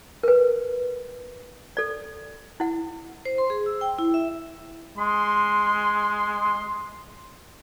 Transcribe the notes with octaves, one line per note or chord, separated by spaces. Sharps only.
A#4 B4
A4 D5
E4 F#5
C5
C6
G#4
E6
G5
E4
E5
G#3 C6